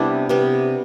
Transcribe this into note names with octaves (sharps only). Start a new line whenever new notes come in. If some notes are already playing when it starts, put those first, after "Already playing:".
Already playing: C3 G3 B3 D4 E4
C3 G3 B3